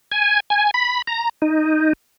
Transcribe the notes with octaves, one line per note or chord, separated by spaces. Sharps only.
G#5
G#5
B5
A#5
D#4